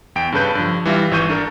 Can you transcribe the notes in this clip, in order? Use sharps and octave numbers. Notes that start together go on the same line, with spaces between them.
E2 G5 D7
G2 C#3 A4 B4 G6
G2 F3
E3 G3 F4 E5
G#1 E3 C#6 G6 D#7
D4 A4 A#4